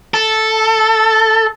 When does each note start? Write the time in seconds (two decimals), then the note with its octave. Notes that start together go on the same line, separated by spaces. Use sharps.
0.14 A4